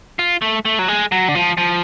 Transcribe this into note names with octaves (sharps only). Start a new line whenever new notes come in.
F4
A3
A3
F#3
G#3
F#3
D3
F3
F3